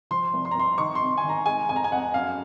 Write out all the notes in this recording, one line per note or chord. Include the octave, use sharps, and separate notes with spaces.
F3 C6
C2
C6
A#5
C2 C6
D#3 C#6
C6
C3
G#5
D#3
A#5
G#3 G#5
F2 G#5
A#5
G#5
F2 F#5
F#2 F5